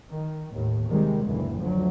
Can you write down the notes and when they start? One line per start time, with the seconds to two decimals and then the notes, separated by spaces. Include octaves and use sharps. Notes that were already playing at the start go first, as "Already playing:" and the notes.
0.11 D#3
0.52 D#2 A2
0.89 C3 D#3 G3 G#3
1.24 F#1 D2 A#2 E3
1.59 D2 F3 F#3